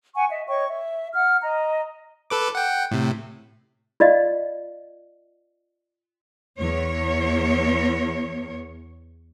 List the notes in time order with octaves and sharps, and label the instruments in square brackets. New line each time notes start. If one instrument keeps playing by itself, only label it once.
[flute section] F#5 G#5 C#6
D#5 E5
C#5 D#5 G5 C#6
E5
F#5 F6
D#5 A#5
[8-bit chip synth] A4 B4 D6
F#5 G5
A2 C3
[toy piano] F4 D5 D#5 F5
[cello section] E2 C#5